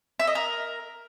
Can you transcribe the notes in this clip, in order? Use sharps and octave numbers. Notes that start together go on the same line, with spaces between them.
E5
D#5
A#4